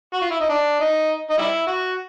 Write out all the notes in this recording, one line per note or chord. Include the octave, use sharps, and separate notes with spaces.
F#4
F4
E4
D#4
D4
D#4
D#4
G3 E4
F#4